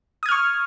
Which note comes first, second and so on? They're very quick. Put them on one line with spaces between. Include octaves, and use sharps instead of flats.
D#6 G#6 F6 C#6